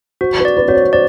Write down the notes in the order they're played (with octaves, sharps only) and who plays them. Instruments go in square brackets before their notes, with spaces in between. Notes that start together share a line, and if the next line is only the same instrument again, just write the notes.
[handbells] F#4 [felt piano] C5
[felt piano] B4
[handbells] D5
[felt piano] B4
[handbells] F#4 [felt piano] C#5
[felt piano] C5
[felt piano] C5 [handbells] D5